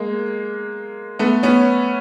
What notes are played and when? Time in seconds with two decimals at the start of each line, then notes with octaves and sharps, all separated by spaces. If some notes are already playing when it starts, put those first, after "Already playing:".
Already playing: G#3 A#3
1.19 A3 B3
1.43 B3 C#4